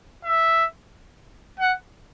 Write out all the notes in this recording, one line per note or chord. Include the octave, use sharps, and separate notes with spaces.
E5
F#5